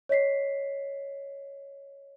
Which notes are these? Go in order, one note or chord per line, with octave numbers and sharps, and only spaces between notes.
C#5 D#5 B6 C7